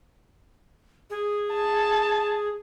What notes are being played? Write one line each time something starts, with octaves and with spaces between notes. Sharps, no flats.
G#4
A5